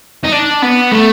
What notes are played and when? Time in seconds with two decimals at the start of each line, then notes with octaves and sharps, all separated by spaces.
0.24 D#4
0.32 D4
0.62 B3
0.91 A3